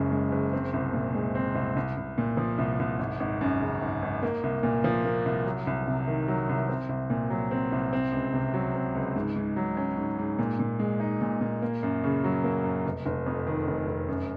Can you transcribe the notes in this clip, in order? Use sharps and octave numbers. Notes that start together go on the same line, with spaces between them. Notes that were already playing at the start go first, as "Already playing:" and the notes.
Already playing: F#1 F#2 C#3 G#3
G#3
F#1
C4
C2
A#2
G#3
C4
C2
C2
C2
A#2
F3
C2
C2
G#1
G#1
F#2
C#3
G#1
G#1
A#3
C2
A#2
F3
A#3
C2
F#3
C2
C3
D#3
F#3
C2
C4
C2
A#2
F#3
C4
C2
C4
C#2
C3
F#3
C4
C#2
G#2
G#2
F#3
C#4
G#2
G#2
A#2
A#2
G#3
D#4
A#2
A#2
A#3
F#2
C#3
F#3
A#3
F#2
F1
F1
F2
D#3
F1
F1
F#2